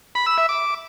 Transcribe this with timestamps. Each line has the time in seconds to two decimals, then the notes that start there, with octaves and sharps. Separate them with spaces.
0.15 B5
0.26 E6
0.38 E5
0.49 D6